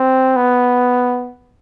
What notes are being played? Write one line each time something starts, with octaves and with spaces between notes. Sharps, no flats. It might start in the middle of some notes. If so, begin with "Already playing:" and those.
Already playing: C4
B3